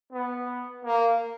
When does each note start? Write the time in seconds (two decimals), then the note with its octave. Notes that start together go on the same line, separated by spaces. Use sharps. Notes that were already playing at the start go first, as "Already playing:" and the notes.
0.13 B3
0.85 A#3